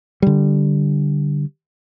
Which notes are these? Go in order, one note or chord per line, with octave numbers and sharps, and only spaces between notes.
D3 G3